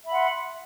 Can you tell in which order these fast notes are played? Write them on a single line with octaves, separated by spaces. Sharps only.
E5 B5 F#5 C6